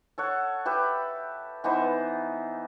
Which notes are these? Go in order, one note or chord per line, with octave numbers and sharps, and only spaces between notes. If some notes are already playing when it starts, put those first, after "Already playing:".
A4 C#5 F#5
G4 B4 E5 G5
E3 B3 D#4 C5